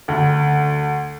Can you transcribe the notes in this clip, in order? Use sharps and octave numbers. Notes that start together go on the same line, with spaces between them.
D2